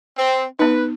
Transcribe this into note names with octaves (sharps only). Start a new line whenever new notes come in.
C4
B3 D#4 B4